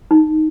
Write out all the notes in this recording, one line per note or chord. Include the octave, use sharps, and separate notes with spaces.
D#4